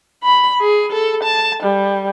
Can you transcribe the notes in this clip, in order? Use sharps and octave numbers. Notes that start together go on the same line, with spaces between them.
B5
G#4
A4
A5
G3